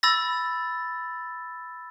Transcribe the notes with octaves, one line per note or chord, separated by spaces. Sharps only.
B5 E6 A6 A#6